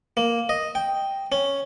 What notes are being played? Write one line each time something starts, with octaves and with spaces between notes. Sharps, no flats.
A#3
D#5
G5
C#4